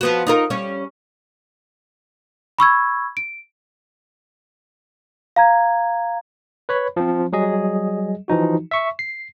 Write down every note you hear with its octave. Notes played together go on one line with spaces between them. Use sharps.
F3 B3 F#4
D#4 F4 A#4
G3 C#4 C#5
B5 C#6 E6 G#6
D7
F5 A#5 G#6
B4 C#5 B5
F3 C4
F#3 G3 G#4 D#5
E3 F3 D#4 F#4
E5 C#6
C7